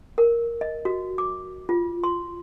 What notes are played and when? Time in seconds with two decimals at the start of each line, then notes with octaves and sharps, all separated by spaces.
0.18 A#4
0.61 D#5
0.85 F#4
1.18 D6
1.69 F4
2.04 C6